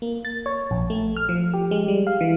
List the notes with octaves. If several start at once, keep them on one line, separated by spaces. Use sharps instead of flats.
A#3
A6
C#5
A#1
A3
F6
F3
G4
G#3
G3
F5
E3